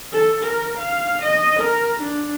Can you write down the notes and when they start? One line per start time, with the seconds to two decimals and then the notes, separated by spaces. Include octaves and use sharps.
0.12 A4
0.44 A#4
0.78 F5
1.23 D#5
1.60 A#4
2.01 D4